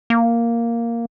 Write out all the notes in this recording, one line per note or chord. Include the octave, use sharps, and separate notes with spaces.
A#3